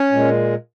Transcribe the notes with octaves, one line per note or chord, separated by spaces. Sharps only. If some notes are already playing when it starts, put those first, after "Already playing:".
Already playing: C#4 C#5
A#2 G#3